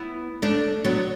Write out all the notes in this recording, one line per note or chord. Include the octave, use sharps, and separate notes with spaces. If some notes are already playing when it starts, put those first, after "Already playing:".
Already playing: B3 E4
A3 D4
F#3 B3